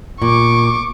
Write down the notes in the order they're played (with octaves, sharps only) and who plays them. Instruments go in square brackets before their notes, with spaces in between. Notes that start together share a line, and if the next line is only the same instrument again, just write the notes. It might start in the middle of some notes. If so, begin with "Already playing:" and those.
[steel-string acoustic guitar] A#2 [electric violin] C#6 D6